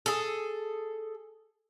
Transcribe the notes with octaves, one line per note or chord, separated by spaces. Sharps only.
G#4 A4